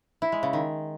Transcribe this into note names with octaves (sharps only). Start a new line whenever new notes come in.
E4
G#3
C#3
D#3